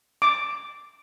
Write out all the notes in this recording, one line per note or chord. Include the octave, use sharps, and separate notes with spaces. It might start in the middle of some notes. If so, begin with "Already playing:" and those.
D6